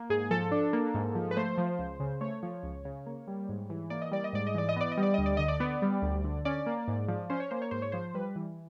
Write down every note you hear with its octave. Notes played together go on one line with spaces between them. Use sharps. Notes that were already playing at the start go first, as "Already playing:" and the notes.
Already playing: A#3
G#2 G#4
F3 A4
D4
A#3
G#2
F3
B4
A3 C5
F3
C#2
C#3
A3 C#5
F3
C#2
C#3
A#3
G3
G#2
E3
A#3 D5
D#5
G3 D5
D#5
G#2 D5
D#5
E3 D5
D#5
B3 D5
D#5
G3
D5
D2 D#5
D5
D3 D#5
D5
B3
G3
D2
D3
C#4 D5
A#3
G#2
F3
C#4 C5
C#5
A#3 C5
C#5
G#2 C5
C#5
F3 C5
G3 B4
E3